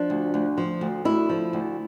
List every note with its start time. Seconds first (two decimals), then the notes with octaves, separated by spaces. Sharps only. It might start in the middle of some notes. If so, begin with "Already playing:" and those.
Already playing: F3 D4
0.10 D2
0.34 D2
0.58 F3
0.81 D2
1.05 D2 E4
1.29 F3
1.53 D2